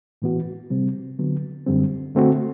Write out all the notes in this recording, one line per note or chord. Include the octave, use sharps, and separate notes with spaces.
A2 E3 B3 F#4
C3 G3 C4
D3 F#3 B3
F#2 D3 G3 C4
D3 A3 C4 F#4